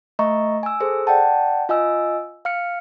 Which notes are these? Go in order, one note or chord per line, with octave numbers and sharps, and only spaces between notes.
A3 D#5 E5 A#5 C#6
G#5 E6
G#4 A4 C5
D5 F#5 G5 A5
F4 D#5 G#5 E6
F5 F6 C#7